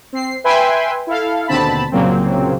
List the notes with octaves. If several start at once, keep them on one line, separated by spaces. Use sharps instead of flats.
C4 C7
B4 E5 G5 G#5 B5 C6
E4 A4 F5
D#2 B2 D3 C4 A5 B5
C2 A#2 C#3 F#3 A#3 C4